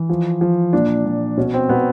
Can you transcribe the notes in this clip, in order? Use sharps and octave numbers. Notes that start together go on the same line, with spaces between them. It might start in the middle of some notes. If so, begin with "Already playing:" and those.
Already playing: E3
F3
F3
A#2 D4
A#2
B2 C#4
C4
B2 B3